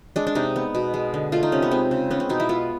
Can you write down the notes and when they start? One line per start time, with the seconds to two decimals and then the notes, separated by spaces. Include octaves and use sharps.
0.16 G#3 D4
0.27 D4
0.35 C3 D#4
0.56 B3
0.75 B2
0.94 G#3
1.14 D3
1.32 A3 F4
1.43 D#4
1.52 C3 C#4
1.62 B3
1.71 G#3 C4
1.91 C#3
2.10 B3 C#4
2.20 C4
2.29 B2 D#4
2.40 E4
2.49 B3 F4